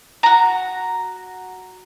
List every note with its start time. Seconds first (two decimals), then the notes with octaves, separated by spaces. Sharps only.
0.23 F#4 A#5